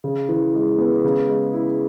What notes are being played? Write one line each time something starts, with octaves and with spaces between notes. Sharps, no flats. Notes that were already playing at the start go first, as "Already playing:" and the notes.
C#3
E3
G#3
B3
C#3
G#3
E4